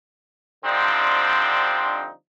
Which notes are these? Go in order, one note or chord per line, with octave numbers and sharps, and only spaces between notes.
D3 F3 G3 C4 D4 D#4